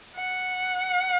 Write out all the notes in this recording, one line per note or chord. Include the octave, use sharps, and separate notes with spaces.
F#5